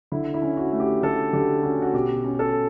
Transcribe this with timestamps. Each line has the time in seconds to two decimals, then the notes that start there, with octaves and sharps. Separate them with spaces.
0.12 D3 E4
0.34 E4
0.42 C#4
0.57 F#4
0.72 A3
0.80 G4
1.03 D3 A4
1.33 D3 G4
1.63 C#4 F#4
1.82 F#4
1.94 B2 G4
2.24 C#4
2.39 A4